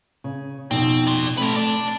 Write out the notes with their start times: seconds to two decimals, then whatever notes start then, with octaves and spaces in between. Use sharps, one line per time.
0.24 C#3
0.71 F2 B2 C4 D#4
1.07 D5 C6
1.37 A3 C4 A4 B4
1.56 D5 A5